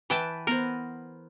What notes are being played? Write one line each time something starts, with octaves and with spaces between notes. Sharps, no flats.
E3 B4 G5 A5
B3 A#4 C5